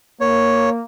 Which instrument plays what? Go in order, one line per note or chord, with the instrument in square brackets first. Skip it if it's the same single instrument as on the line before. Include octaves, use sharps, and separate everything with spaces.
[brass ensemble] A#3 [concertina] C#5